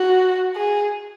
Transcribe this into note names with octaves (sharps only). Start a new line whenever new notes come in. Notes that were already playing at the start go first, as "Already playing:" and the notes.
Already playing: F#4
G#4